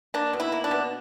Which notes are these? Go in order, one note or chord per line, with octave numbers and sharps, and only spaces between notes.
A#3 D4
B2
E4
A#3
D4
B2